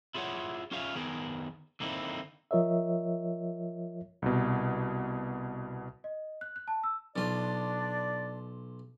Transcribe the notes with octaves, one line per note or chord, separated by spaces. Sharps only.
E4 F4 G#4 C#5 F#5
C#4 F4 G#4 C#5 E5 F5
D#3 B3 G#4 A#4
D3 D#3 A#3 C4 D#4 E4
F3 F4 A#4 C#5 D#5 E5
C2 B2
D#5
F#6
F#6
A5
E6
B1 D4 F4 D5